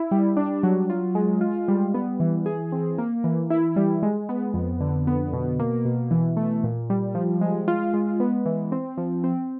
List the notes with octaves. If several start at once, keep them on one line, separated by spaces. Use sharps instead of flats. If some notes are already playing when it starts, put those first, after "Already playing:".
Already playing: E4
G3
D4
F#3
F4
G#3
F4
G3
B3
E3
G#4
C4
A#3
E3
E4
G3
G#3
B3
F2
D3
B3
B2
A#3
B2
E3
A3
A#2
G3
F3
G#3
F4
G#3
B3
E3
C4
F3
C4